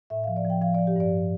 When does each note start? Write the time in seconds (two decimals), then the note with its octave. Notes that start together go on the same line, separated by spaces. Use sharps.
0.10 A2 E5
0.24 F5
0.28 F3
0.36 D5
0.45 F3 G5
0.62 F3 F5
0.75 D5
0.79 F3
0.87 G4
0.96 G2 D5